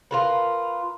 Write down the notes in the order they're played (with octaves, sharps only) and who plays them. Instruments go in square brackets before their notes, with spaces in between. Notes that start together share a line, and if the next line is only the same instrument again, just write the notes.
[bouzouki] F4 A#4 B4